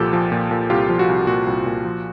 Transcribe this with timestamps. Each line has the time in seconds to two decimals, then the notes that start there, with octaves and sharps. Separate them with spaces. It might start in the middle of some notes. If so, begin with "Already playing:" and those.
Already playing: C2 A#2 F3 G4 A4
0.13 F3
0.32 A#2
0.51 A#2
0.70 C2 F4 G4
0.89 F3
0.99 F#4
1.08 C2
1.27 A#2 F#4
1.47 C2
1.66 A#2
1.85 F3